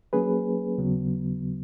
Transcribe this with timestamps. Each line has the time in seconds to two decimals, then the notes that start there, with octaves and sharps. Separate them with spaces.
0.13 F#3 A#3 C#4 G#4 B4
0.78 D#2 C#3 F#3 B3